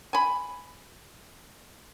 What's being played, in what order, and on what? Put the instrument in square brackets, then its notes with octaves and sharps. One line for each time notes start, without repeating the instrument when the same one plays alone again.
[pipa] G#5 B5